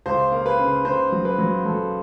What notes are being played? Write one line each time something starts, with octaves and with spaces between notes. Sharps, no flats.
C#2 C5
A#3
B4
C#3
C#3 C5
F#3
B4
F#3
F#3 A4